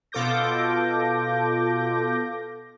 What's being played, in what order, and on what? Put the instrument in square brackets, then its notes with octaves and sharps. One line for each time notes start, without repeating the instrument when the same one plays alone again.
[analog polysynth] B2 F4 A4 D6 G6 A#6